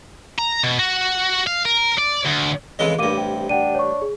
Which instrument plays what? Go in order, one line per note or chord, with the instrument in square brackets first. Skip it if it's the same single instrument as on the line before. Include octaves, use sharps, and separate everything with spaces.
[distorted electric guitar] A#5
B2
F#4
F5
A#4
D5
D2
[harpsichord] F2 E3 G#3 [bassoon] C#3 [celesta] D#5
[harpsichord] A1 G2 [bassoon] A#3 [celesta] D6 D#7
[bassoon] C3 [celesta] G5
[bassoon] D4 [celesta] F#5 G5 D#7
[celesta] C#5 C#6
G#4